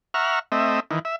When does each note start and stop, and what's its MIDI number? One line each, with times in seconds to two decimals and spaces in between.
0.14 0.39 76
0.14 0.39 78
0.14 0.39 82
0.14 0.39 85
0.14 0.39 89
0.52 0.80 57
0.52 0.80 60
0.52 0.80 75
0.52 0.80 76
0.91 0.99 51
0.91 0.99 52
1.05 1.16 76